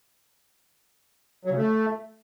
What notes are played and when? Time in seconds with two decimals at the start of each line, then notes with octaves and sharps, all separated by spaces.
1.45 F#3
1.51 C#3
1.57 A3